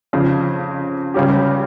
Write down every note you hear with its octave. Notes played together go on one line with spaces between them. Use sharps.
F2 C#3 F3
C#2 C#3 G3 C#4 G4